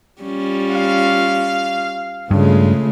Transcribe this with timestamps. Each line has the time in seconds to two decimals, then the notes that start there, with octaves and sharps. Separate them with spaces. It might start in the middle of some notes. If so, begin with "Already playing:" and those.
0.22 G3 C#4 F4
0.71 F5
2.31 G2 C#3 G#3 A3 F4